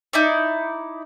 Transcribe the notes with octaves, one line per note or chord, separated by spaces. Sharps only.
D#4 E4 D5